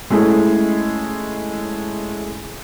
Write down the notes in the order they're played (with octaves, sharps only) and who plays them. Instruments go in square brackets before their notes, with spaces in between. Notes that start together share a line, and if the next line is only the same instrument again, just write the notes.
[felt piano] G#3 A3 C#4 E4 G#4